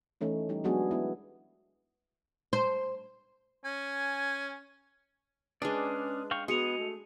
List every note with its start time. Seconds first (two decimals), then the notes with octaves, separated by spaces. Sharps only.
0.21 E3 A3 C#4 D#4
0.49 G3 D#4 G4
0.64 F#3 G#3 B3 D4 F#4 G#4
0.91 B3 E4
2.53 C5
3.65 C#4 G#5
5.62 G#3 C#4 D4 G#4 B4 D5
6.31 F5 G5 C#6
6.48 B3 F#4 G#4 D#5 C#7 F7
6.79 A3